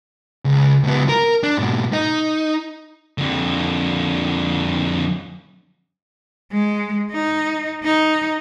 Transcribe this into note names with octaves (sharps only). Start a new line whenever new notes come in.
C#2
C#2 B3
A#4
D4
G#2 B2
D#4
F2 D3
G#3
D#4
D#4